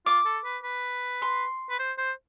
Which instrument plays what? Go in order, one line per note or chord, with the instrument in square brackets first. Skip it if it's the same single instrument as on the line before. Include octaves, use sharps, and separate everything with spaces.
[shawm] F4 [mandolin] D6
[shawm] A4
B4
B4
[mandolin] C6
[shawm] B4
C5
C5